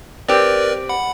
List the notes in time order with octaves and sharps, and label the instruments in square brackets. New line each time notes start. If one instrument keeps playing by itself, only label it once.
[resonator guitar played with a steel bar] C4 G4 [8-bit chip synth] A#4 B4 D5
[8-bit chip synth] F#5 B5